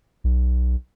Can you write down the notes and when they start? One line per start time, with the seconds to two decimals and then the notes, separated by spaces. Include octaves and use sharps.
0.24 B1